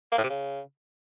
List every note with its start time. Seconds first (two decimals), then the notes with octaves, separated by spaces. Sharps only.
0.12 A#3
0.18 A2
0.24 C3
0.29 C#3